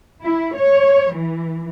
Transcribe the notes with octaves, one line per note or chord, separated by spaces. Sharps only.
E4
C#5
E3